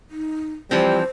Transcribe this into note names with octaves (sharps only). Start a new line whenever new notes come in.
D#4
E3 F3 G3 C4 C5